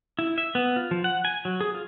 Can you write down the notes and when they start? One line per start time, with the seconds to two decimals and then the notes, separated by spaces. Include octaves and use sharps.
0.19 E4
0.38 E5
0.55 B3
0.76 F4
0.91 F3
1.04 F#5
1.25 G#5
1.45 F#3
1.61 G#4
1.74 F4